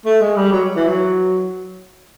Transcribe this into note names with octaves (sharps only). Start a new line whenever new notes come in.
A3
G#3
G3
F#3
E3
F#3